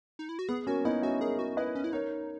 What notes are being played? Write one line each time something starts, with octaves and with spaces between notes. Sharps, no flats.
D#4
E4
F#4
B3 G#4
A#3 C#4 F#4
B3 D#4 E4
C#4 E4 F#4
G#4 A#4 C#5
F#4
E4 B4 D#5
C#4
E4
D#4 A#4 C#5